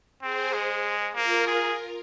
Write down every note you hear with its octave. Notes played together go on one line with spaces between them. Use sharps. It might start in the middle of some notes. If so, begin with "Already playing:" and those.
C4 G#4 C5
G#3
A#3 F4 A#4
G#4